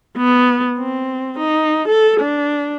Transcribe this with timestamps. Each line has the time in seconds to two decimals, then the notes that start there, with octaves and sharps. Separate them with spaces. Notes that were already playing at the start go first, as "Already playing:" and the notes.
0.17 B3
0.78 C4
1.39 D#4
1.88 A4
2.20 D4